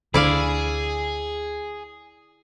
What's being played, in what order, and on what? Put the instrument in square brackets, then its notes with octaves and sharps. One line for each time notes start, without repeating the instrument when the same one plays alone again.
[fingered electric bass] D2 D3 [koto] E4 D5 F5 [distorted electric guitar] G#4